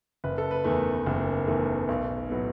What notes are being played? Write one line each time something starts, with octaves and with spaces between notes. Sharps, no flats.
F#1 B4
A4
B4
E2 D#3 A3
F#1
E2 D#3 A3
B1
A2 F#3 B3